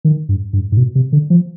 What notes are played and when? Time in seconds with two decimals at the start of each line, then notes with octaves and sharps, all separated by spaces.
0.05 D#3
0.29 G2
0.53 G2
0.72 G#2
0.77 B2
0.95 C3
1.12 D3
1.30 F3